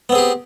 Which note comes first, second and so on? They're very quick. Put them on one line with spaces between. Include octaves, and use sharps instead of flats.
B3 C4 G#4 G4